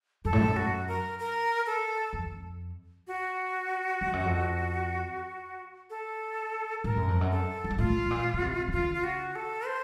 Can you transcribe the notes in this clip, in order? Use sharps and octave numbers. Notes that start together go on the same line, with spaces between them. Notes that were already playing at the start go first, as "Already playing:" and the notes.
F#2 A4
A2
F#2
F#4
A#4
A#4
A4
F2
F#4
F2
F#2
F2
A4
A2 A#4
F#2
F2
F#2
A4
F2
F#2
A2 F4
A2
A#2
C#3
C3
D#3
C#3 F4
F4
F#4
A4
C5